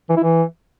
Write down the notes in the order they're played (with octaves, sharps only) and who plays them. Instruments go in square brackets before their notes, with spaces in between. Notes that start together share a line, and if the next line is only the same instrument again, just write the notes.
[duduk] E3
E4
E3